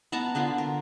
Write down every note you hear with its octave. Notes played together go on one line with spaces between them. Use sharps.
B3 F#5 A5 A#5
D3 B3 F4
A#4